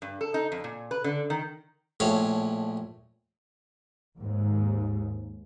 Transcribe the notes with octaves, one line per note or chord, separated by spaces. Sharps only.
G2
A4
D#4
F2
A#2
B4
D3
D#3
A#1 A2 C#5 F5
D#2 G#2